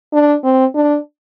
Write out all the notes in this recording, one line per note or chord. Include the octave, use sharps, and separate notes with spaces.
D4
C4
D4